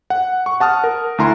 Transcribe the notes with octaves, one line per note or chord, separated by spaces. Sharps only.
F#5
C#6
F#5 A5 D#6 F6
A#4
D2 E4 A#5 C6